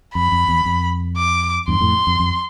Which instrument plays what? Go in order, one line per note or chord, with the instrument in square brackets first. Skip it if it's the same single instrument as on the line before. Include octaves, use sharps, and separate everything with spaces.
[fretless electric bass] F2 [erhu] B5
[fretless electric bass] F2
E2
F2
[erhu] D6
[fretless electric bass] E2 G2 [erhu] C6
[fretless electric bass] F2 A2
F2
F2